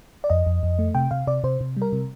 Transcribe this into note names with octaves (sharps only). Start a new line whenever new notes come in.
D5
F2 D#5
F2
F2
A3
C3 G5
C3 F5
C3 D5
C3 C5
C3
G3
A#4
C3